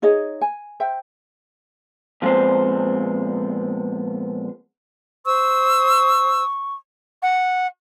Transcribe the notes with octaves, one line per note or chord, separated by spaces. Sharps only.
D#4 G#4 C#5 D#5
G#5
C5 E5 G5
A#2 F3 G#3 B3 C4 C5
C5 C#6 E6
F#5